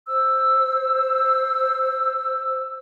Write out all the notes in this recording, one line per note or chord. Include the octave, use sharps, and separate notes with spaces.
C5 E6